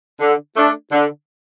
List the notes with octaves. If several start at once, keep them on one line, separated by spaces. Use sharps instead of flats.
D3
A3 D4
D3